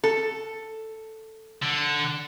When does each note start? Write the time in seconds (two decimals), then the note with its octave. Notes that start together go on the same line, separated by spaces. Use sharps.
0.04 A4
1.62 D3